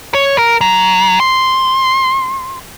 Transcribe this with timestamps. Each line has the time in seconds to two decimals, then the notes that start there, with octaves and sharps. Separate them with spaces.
0.15 C#5
0.38 A#4
0.61 F#3
1.20 C6